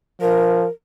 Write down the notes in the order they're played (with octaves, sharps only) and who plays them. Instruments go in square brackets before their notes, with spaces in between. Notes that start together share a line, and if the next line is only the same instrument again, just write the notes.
[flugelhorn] F3 [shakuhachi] A#4